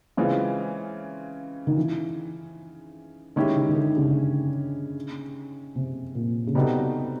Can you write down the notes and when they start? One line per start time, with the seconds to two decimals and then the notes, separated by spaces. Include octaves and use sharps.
0.17 C#3 E3 G#3 C4 F4
1.67 D#3
1.77 E3
3.36 D#3 G#3 C#4 E4 G4
3.56 D#3
3.69 D#3
3.76 D3
3.97 C#3
5.75 C3
6.15 A#2
6.47 C#3
6.55 C3 G3 B3 D#4 F#4 A4